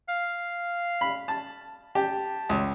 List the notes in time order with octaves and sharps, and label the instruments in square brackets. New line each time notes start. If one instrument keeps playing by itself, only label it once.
[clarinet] F5
[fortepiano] B5
A5
[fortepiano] G4 [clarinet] A5
[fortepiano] C#2